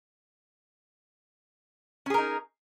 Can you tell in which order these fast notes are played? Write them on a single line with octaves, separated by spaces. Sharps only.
C#4 G#4 A#4 D#4